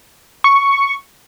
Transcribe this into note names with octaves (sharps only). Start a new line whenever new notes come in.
C#6